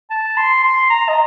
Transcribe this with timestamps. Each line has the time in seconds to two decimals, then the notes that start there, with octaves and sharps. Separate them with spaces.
0.10 A5
0.37 C6
0.63 C6
0.90 A#5
1.09 D#5